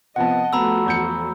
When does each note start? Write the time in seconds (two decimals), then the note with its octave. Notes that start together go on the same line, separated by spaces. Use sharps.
0.16 C3 F3 B3 D#5 F#5 A5
0.53 F3 A3 B3 F#4 A#5 B5 E6
0.86 E2 G6 C#7